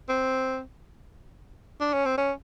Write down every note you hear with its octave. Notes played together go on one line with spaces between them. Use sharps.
C4
D4
C#4
C4
C#4